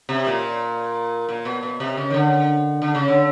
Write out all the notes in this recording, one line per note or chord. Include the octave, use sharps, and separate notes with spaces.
C3
A#2
A#2
B2
B2
C3
C#3
D#3
D3
D3
C#3
D3